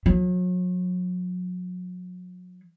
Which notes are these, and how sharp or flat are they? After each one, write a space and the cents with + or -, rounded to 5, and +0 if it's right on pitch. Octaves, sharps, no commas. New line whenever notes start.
F#3 -35